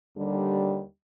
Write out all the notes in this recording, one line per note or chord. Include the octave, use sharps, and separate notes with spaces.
D#2 D3 G3